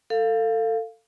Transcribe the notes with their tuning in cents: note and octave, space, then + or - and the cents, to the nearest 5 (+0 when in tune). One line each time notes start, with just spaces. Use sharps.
A4 +25 F5 +0